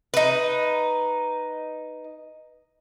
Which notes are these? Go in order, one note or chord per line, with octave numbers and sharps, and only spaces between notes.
D#4 B4